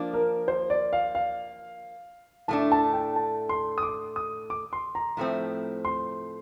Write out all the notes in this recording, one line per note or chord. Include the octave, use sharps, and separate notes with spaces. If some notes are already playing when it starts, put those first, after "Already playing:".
Already playing: F3 A#3 D4
A#4
C5
D5
F5
F5
A2 A3 D4 A5
A5
G5
A5
C6
D#6
D6
D#6
D6
C6
A#5
A2 F3 A3 C4
C6